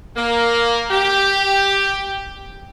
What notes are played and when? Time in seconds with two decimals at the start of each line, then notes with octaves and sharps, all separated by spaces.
0.15 A#3
0.89 G4